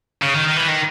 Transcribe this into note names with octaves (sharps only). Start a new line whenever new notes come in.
C#3
D#3
D#3
E3
D#3